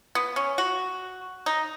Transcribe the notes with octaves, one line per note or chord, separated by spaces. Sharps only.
B3
C#4
F#4
D#4